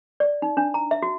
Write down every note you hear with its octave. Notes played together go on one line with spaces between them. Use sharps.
D5
D#4
D4
A#5
E5
F#4